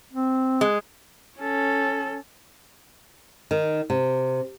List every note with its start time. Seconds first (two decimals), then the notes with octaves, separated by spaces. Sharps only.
0.13 C4
0.61 G#3
1.39 C#4 A4
3.51 D#3
3.90 C3